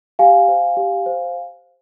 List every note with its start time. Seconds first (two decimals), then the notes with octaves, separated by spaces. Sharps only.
0.19 G4 F5 G#5
0.48 C5
0.77 G4
1.06 C5